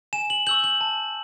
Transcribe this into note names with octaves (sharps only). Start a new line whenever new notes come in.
G#5 E7
F#7
C#6 E6 G6 F#7
F#7
A5